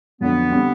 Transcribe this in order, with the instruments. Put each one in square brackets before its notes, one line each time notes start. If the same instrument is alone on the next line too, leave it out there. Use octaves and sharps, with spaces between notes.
[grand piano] F2 D3 F#3 [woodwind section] B3
[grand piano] D3 G3 C4